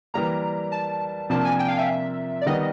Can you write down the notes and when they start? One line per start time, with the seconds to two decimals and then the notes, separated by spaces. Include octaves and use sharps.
0.14 E3 G3 A#3 A#5
0.72 A5
1.30 C3 F3 A#3 D4 F4 A5
1.44 G#5
1.59 G5
1.68 F5
1.78 E5
2.41 D5
2.46 D#3 G3 B3 D#5